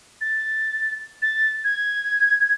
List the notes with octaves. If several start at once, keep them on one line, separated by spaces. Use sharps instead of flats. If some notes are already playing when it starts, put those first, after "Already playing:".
A6
A6
G#6